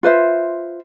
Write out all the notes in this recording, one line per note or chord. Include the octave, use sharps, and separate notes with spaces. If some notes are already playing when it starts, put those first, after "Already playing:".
F4 B4 C5 E5